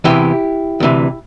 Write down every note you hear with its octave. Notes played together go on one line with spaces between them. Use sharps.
E2 C3 E3 E4 G4
D2 C3 E3